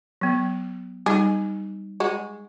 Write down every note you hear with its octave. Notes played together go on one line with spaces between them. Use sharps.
F#3 B3
G3 D#4 G#4
G#3 F#4